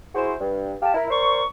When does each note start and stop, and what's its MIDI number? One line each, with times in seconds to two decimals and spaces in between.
0.15 0.34 64
0.15 0.34 66
0.15 0.34 68
0.15 0.34 72
0.40 0.73 43
0.82 0.94 67
0.82 0.94 77
0.82 0.94 81
0.95 1.06 64
0.95 1.06 70
1.10 1.43 70
1.10 1.43 72
1.10 1.43 74
1.10 1.43 85